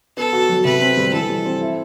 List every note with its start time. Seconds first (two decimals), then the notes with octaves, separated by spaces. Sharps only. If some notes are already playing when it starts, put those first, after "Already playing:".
0.17 B3 A4
0.33 F#4
0.49 F#3
0.65 C3 B4
0.81 C4
0.97 G3
1.13 E3 A4
1.29 G3
1.45 C4
1.61 E4